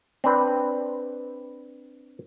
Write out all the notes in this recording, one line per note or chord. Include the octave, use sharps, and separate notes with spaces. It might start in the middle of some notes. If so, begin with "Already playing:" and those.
C4 D4 B4